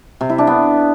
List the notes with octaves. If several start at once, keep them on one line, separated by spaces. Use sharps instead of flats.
C3
E4
D4
B3